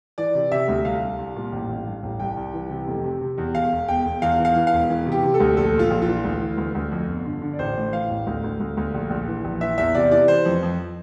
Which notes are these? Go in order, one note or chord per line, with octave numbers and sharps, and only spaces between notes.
E3 D5
C3
C3 E5
D2
C2 F5
C2
C2
A#2
A1
A1
G2
A1
C2 G5
C2
E3
C3
F1
C3
C3
E2
E1 F5
E1
E1 G5
E1
E2 F5
E3
F5
E3
F5
E1
E3
C3
G4
C3
A4
D2
A#1 A4
A#1
F4
A#1
F4
E3
D2
E3
D2
D2
F2
G1
D3
D3
D5
A1 C5
A2
E3 F5
A1
D2
D2
D2
D2
A#1
A#1
E3
A#1
E3 E5
E2 E5
C3 D5
E3 D5
E3 C5
F2
F2